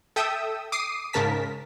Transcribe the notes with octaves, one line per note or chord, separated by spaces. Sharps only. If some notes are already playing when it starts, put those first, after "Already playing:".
A4 E5 G5 D#6 E6
D6 D#6 C7 D#7
G#2 C#3 A#4 A5 B6